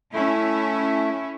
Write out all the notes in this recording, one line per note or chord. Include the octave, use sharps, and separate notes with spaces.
A3 C#4 E4